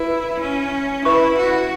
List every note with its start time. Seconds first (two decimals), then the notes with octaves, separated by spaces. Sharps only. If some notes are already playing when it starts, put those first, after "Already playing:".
Already playing: E4 B4
0.40 C#4
1.05 E4 B4 E5 C#6
1.37 F#4